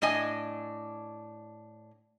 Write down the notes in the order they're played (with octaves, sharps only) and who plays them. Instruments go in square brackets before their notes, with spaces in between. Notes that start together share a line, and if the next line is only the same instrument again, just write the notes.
[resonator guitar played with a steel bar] A2 D4 D#5 G#5